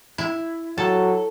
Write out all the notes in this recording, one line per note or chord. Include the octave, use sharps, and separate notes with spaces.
E4
F#3 A4